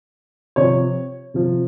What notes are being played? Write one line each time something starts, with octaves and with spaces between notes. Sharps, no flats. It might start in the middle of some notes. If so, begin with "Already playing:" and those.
C3 F3 C#5
C3 F3